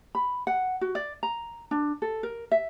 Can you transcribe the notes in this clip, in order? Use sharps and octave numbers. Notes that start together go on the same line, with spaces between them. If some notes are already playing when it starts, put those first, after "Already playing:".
B5
F#5
F#4
D5
A#5
D4
A4
A#4
E5